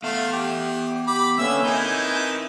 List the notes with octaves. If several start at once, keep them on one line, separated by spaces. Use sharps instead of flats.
A3 B3 E5 F5
G4
G4 B5 D6
D3 A#3 B3 C#4 E5 E6
C4 D#4 E4 A#4 B4 G#5 G6